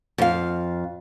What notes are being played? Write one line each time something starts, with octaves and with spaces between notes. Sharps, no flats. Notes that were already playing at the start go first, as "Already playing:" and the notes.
F2 F5